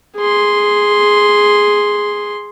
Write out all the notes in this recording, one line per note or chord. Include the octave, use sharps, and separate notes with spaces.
G#4 C6